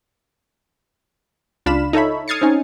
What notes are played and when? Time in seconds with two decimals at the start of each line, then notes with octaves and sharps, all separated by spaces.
1.66 C#2 D4 F4 F5 B5 E7
1.93 D#4 A4 C#5 E5 B5
2.28 D#6 F6 G#6 A6 C7 C#7
2.41 C4 C#4 D#4 G#5